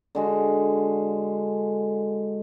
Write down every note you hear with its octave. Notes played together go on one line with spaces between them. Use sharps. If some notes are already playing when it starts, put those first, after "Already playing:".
D3 G#3 F#4